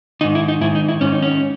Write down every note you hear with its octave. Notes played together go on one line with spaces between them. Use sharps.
G#2 D#3 D#4
E4
D#4
G#2 D#3 E4
D#4
E4
G#2 D#3 C#4
D#4
C#4